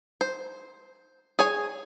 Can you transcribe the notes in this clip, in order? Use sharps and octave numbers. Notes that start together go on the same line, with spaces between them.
C5
G#4 C#5 G#5